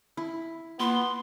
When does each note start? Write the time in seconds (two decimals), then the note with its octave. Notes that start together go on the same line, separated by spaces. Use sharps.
0.17 E4
0.80 A#3 B3 F4 C6